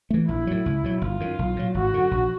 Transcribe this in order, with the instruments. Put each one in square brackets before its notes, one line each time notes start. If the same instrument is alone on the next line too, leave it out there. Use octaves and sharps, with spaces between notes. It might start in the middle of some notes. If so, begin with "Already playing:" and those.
[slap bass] E3 A3
[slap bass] A#1 [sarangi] E4
[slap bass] A2 F#3
C#2
B2 F#3
[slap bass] G1 [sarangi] F4
[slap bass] F#2 D#3
B1
A#2 F#3
[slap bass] G#1 [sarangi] F#4
[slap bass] F#2 D3
A#1